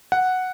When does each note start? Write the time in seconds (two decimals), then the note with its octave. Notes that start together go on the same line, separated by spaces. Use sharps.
0.12 F#5